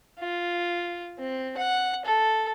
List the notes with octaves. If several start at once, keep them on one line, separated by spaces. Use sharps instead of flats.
F4
C4
F#5
A4